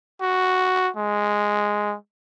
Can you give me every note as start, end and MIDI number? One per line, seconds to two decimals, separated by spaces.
0.22 0.90 66
0.97 1.96 56